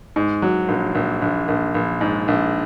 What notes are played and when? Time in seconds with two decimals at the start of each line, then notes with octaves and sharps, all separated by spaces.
0.16 G#2
0.42 F#3
0.68 A#1
0.95 A#1
1.22 A#1
1.48 A#1
1.74 A#1
2.01 G#2
2.28 A#1